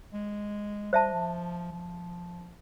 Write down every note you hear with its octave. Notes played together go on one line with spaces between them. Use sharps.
G#3
G3 C5 E5 A5
F3
F3